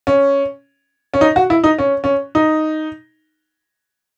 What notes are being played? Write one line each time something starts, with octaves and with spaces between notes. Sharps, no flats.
C#4
C#4
D#4
F#4
E4
D#4
C#4
C#4
D#4